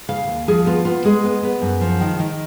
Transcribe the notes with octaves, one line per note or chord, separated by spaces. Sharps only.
C#3 F5
D#2
F3 G#4
B3 F4
B3 F4
G#3 G#4
B3
B3
F#2
F3
D#3
D#3